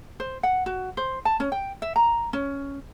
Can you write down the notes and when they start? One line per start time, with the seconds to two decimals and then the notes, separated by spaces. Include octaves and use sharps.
0.20 C5
0.43 F#5
0.66 F#4
0.97 C5
1.25 A5
1.40 C#4
1.52 G5
1.82 E5
1.96 A#5
2.33 C#4